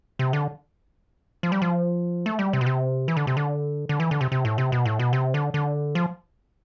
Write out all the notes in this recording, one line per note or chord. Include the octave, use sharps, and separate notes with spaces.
C3
D3
F3
G3
F3
A3
G3
C3
B2
C3
E3
D3
C3
D3
D3
E3
D3
C3
C3
A2
C3
B2
A2
B2
C3
D3
D3
F3